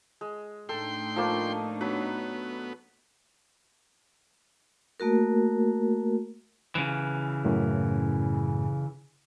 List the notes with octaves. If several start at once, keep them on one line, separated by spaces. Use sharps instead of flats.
G#3
A2 D4 D#4 A4 G5 C6
F3 A3 A#3
F#3 B3 B4
A3 A#3 F#4 A#4
C#3 E3
F#2 A2